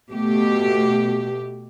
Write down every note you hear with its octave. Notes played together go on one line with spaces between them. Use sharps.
B2 A3 G4